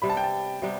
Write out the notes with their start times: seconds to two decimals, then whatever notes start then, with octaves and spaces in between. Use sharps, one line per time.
0.02 C3 G3 B3 B5
0.10 A5
0.17 G5
0.24 A5
0.62 C3 G3 B3